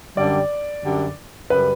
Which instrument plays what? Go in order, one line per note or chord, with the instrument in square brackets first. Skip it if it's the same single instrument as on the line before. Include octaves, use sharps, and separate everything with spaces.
[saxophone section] F#2 D3 G3 [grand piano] D5
[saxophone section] F#2 D3 G3
[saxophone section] F#2 C#3 G3 [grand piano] B4